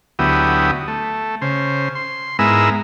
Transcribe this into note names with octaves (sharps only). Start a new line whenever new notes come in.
D2 F#3 B3 E4 G4 D#6
A3
C#3 C5
C6
G#2 G#3 B3 E4 A#4 E6